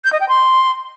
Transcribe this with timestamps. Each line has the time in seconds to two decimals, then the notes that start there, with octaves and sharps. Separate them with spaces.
0.04 G6
0.12 D#5
0.20 G5
0.29 C6